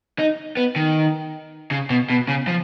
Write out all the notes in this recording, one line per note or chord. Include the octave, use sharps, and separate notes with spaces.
D#4
B3
D#3
C#3
B2
B2
C#3
F3